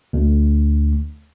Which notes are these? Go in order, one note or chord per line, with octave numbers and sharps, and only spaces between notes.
D2